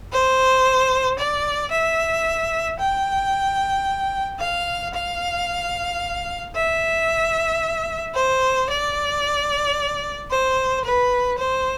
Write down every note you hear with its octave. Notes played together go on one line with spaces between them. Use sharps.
C5
D5
E5
G5
F5
F5
E5
C5
D5
C5
B4
C5